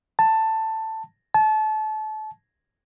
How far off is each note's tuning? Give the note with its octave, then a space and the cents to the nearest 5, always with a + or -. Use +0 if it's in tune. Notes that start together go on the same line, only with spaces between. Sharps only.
A5 +10
A5 -30